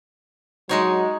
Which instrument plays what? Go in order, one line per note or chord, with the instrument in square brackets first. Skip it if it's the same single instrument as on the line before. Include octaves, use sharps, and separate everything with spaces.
[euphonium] F#3 [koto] G#3 D#4 C#5